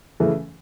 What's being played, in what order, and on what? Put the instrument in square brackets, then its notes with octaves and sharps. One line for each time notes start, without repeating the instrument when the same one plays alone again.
[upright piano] C#3 E3 A3